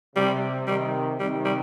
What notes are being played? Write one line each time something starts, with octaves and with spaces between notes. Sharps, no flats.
C3 G3
C3 D#3 G3
C3 D#3 G3
G3